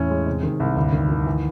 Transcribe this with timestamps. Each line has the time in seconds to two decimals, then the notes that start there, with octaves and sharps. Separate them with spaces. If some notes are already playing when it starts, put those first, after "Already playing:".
Already playing: E2 A2 E3 C#4
0.10 G#3
0.26 C3
0.43 D#3
0.60 C2
0.76 D2 G2 D3
0.93 D#3
1.09 D#3
1.26 E3